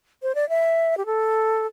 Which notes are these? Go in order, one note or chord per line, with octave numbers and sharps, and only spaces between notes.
C5
D5
E5
G4
A4